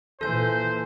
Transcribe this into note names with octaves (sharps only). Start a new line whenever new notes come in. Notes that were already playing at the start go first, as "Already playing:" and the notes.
A#2 E3 A4 C5 G6